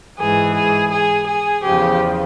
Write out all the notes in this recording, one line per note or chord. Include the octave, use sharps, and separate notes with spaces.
G#2 E3 G#4
G#4
G#4
G#4
E2 C#3 F3 G4